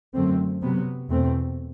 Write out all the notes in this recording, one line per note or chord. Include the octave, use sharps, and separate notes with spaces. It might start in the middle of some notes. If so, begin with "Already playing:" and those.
F#2 D3 A3 C4
C3 F#3 B3
E2 B2 A3 C4